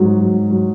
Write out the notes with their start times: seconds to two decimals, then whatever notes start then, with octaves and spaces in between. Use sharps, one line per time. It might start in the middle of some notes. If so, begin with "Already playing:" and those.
Already playing: G#2 F#3
0.20 F#3
0.51 F#3